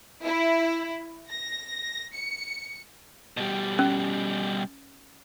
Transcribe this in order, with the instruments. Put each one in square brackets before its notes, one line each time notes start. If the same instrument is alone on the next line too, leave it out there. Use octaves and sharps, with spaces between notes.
[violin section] E4
A#6
C#7
[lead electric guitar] B2 G3
[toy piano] C#4